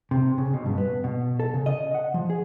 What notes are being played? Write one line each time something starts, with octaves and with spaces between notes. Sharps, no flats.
C3
C#3
B2
G2
B3
B2
A4
C#3
D#5
F#5
F3
G#4